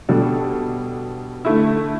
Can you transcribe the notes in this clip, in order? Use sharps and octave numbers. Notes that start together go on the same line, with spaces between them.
B2 G3 D4 A4
D3 A3 E4